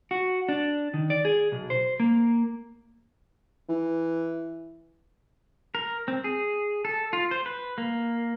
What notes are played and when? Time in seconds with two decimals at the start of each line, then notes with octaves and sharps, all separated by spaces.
0.11 F#4
0.49 D4
0.94 D#3
1.10 D5
1.25 G#4
1.52 B1
1.70 C5
2.00 A#3
3.69 E3
5.75 A#4
6.08 C4
6.24 G#4
6.85 A4
7.13 F4
7.31 C5
7.46 B4
7.78 A#3